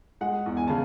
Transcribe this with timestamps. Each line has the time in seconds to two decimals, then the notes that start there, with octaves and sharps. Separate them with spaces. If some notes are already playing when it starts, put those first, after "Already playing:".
0.21 G#3 F#5
0.46 E2
0.57 G#5
0.68 C#3 A5